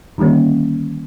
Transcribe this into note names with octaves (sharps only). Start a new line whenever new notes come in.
D3 D#3 G3 A#3 C#4